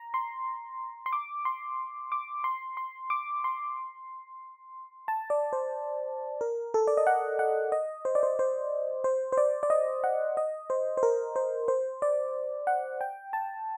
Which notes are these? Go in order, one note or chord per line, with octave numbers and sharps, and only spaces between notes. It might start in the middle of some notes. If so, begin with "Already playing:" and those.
Already playing: A#5
C6
C6
D6
C6
D6
C6
C6
D6
C6
A5
D5
C5
A#4
A4
D5
D#5
F#5
F#5
D#5
C5
D5
C5
C5
C5
C5
D5
D5
D#5
F#5
D#5
C5
C5
A#4
C5
C5
D5
F#5
G5
A5